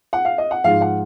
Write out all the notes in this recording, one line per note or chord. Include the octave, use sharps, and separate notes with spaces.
F#5
F5
D#5
F#5
G#2 F3 G#3 F5
F#5